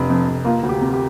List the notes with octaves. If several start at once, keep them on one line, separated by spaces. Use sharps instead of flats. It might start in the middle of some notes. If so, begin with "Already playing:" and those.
Already playing: F1 C3 D4
F2
F1
A#3 F4
D2
G4
C3
G4